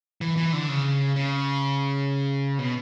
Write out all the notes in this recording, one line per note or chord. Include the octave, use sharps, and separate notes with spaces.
E3
E3
D3
C#3
C#3
B2